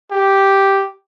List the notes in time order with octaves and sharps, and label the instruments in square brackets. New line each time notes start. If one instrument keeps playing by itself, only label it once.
[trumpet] G4